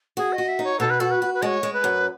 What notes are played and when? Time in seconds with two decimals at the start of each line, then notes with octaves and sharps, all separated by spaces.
0.17 F#4 G#4
0.33 D#5
0.38 F#4
0.48 E5
0.59 D#4
0.64 C#5
0.80 B2 A4
0.90 B4
1.00 F#4 A4
1.11 B4
1.22 F#4
1.34 B4
1.42 G#3 C#5 D#5
1.63 G#3
1.73 B4
1.84 F#2